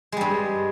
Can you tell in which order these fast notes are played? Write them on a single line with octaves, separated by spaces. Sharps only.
G#3 G3 G2